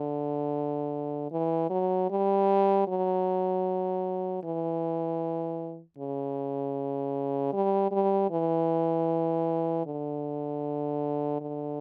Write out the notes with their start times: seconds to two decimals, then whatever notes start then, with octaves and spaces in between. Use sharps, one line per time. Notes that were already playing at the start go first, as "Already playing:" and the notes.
Already playing: D3
1.32 E3
1.70 F#3
2.10 G3
2.88 F#3
4.43 E3
5.98 C#3
7.53 G3
7.92 G3
8.31 E3
9.86 D3
11.41 D3